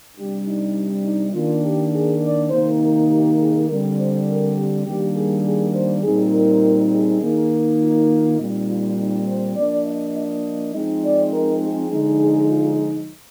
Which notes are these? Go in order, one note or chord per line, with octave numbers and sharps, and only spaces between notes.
C3 G3 D4 G4
D#4
D#4
D#3 A#3 D4 F4
G4
G#4
D5
C3 D#3 A#3 D#4 C5
A#4
G4
G#4
D3 G3 C4 A#4
C5
A#4
G4
D#3 G3 A#3 D4 G4
G#4
G#4
C5
A#2 G3 C4 D#4 G#4
A#4
G#4
D#3 A#3 D#4
F4
F4
A#2 G3 C4 D#4
F4
D#4
C5
F3 A#3 D4 D5
D#5
D#5
F3 G#3 C4 D#4
D5
A#4
G#4
D3 F3 G#3 D#4
G#4
F4